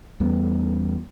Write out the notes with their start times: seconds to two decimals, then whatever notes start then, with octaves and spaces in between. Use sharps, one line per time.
0.20 E2 G3 A3 B3